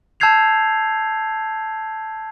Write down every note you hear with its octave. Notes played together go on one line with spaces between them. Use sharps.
A5 E6 G6 G#6 C7 F7